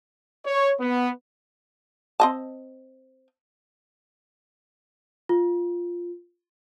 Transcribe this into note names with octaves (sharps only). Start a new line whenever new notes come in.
C#5
B3
C4 D#5 A5
F4